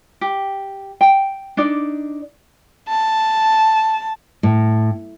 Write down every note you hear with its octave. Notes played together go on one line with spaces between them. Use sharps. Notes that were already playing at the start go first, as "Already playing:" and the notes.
G4
G5
D4 D#4 D5
A5
A2